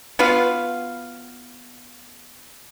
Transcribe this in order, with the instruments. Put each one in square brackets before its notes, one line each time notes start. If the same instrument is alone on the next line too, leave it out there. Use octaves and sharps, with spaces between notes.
[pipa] B3 F4 F#4 F5